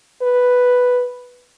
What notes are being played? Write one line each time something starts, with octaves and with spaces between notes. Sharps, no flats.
B4